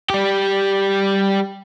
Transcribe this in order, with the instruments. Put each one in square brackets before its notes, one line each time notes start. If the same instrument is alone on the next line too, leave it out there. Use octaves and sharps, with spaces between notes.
[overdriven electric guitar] G3 G4